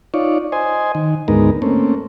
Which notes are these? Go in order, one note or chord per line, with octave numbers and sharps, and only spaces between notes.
D#4 F4 C#5 D5
C5 D#5 G#5
D#3
D2 G#2 G#3 B3 D#4 A#4
A3 A#3 C4 C#4